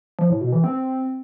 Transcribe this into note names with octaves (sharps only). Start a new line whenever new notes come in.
F3
A2
B2
E3
C4